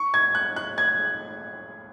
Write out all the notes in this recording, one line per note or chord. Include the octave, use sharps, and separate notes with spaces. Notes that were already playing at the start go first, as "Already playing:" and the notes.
Already playing: C#6
G#6
F#6
F#6
G#6